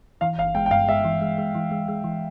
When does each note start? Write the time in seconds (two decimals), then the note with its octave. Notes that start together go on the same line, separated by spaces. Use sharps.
0.21 E3 F5
0.38 G1 F5
0.55 G#3 G5
0.66 G5
0.71 G2 F5
0.88 G#3 E5
1.05 E3
1.21 G#3
1.38 G#3
1.55 E3
1.71 G#3
1.88 G#3
2.04 E3